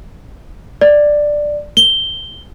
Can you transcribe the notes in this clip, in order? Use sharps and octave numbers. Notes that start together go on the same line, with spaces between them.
D5
G7